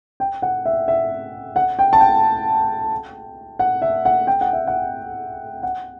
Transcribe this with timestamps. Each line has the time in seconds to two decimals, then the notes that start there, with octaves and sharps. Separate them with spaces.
0.20 G5
0.42 F#5
0.65 E5
0.88 E5
1.56 F#5
1.79 G5
1.93 A5
2.01 G5
3.59 F#5
3.82 E5
4.05 F#5
4.27 G5
4.41 F#5
4.53 E5
4.67 F#5
5.63 F#5